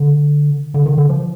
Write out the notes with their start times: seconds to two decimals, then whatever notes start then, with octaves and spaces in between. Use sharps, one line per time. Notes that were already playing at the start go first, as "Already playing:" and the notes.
Already playing: D3
0.74 D3
0.86 D#3
0.98 D3
1.09 F3